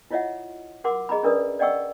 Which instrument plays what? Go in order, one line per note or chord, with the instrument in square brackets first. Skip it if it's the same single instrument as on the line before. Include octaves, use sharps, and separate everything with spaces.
[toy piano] E4 F4 C#5 D#5 E5 F#5
F#4 A#4 F#5 C6 D6
G#4 D#5 A#5 B5
C#4 D4 A#4 B4 D5 D#6
D5 D#5 F#5 G5 C#6 E6